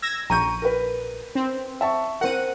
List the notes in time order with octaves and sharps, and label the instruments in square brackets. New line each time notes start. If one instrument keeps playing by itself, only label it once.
[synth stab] E6 G#6 A#6
[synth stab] A#1 D#7 [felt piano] A#5 C#6 G6
[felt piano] A#4 B4
[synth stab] C4
[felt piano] E5 A5 C#6
[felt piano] C4 A#4 [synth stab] F#5 D#7